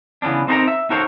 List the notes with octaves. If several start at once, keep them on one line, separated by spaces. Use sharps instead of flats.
C#3 E3 B3 C#4 D4
C4 D#4 F#4 A4 A#4 A#5
E5
D#4 F#4 A4 A#4 C5 C#5